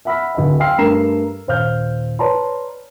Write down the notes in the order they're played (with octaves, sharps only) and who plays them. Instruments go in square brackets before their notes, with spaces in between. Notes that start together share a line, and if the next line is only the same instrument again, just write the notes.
[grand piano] E5 F#5 B5 E6 F6 B6
D1 D#5
F5 G5 C6 E6 F6 C7
G2 A3 A#4 A#5 C7 E7
D#1 C5 F5 F6 G6
B4 C#5 D5 A5 A#5 C6